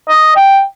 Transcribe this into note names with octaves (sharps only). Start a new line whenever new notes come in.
D#5
G5